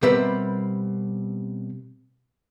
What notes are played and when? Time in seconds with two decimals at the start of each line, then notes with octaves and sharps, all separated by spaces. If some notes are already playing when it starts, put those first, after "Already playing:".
0.03 B2 G3 C4 A#4 B4 E5